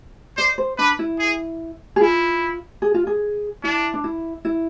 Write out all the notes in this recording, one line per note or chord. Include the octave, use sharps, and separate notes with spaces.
C5 D5
C5
D4 B4
E4
G#4
G#4
E4 F4
G#4
F4
G#4
D4 E4
D4
E4
E4